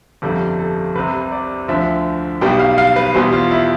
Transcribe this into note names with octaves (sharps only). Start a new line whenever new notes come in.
G1 F2 C3 G3 A4
A4
C2 C3 G3 B4
D5
D2 D3 F3 E5
B1 B2 G3 G5
F5
F5
B4
E2 B2 G3 C5
F4
E4